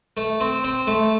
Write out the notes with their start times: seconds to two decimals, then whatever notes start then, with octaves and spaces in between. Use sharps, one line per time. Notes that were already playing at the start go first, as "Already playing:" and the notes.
0.17 A3
0.40 C4
0.64 C4
0.87 A3